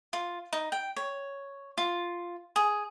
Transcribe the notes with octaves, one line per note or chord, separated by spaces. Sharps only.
F4
D#4
G5
C#5
F4
G#4